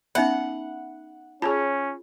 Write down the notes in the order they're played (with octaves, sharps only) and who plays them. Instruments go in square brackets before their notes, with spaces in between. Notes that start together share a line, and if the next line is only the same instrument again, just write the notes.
[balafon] B3 C#4 [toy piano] D#4 E5 B5 [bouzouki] F#5
[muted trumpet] C#4 [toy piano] F4 [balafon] G#4 C#5 A5